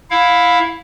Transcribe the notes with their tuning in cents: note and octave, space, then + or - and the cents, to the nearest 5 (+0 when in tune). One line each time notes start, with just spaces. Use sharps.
E4 +5 F5 +20